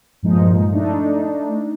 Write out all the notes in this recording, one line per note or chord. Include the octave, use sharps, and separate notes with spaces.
G2 A#2 F3 G#3 D#4
A3 D4 D#4